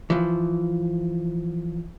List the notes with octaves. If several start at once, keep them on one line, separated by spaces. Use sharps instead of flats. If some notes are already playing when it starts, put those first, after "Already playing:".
E3 F3